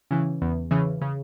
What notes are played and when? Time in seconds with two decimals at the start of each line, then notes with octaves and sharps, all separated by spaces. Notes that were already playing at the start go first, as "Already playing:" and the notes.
0.11 C#3 E3
0.42 E2
0.71 C#3 E3
1.01 C#3